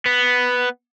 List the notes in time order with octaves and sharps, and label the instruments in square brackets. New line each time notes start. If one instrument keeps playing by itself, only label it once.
[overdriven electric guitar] B3